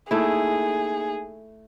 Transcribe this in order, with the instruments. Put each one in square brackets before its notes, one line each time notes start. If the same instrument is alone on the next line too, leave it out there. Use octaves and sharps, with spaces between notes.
[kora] A3 E4 [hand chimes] A#3 D#4 [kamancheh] G#4